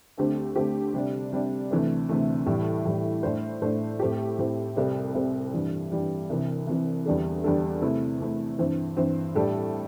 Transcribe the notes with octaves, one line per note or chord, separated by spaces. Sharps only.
D2 D3 A3 C4 G4
D2 D3 A3 C4 G4
C3 G3 D4
C3 G3 D4
D2 C3 E3 A3
D2 C3 E3 A3
A2 E3 G3
A2 E3 G3
A2 A3 D4 C5
A2 A3 D4 C5
A2 A3 C4 E4 G4
A2 A3 C4 E4 G4
C2 C3 G3 C4 A4
C2 C3 G3 C4 A4
G2 E3 G3
G2 E3 G3
C2 C3 E3
C2 C3 E3
E2 D3 G3 D4 A4
E2 D3 G3 D4 A4
C3 A3 E4
C3 A3 E4
G2 E3 C4
G2 E3 C4
A2 G3 D4 A4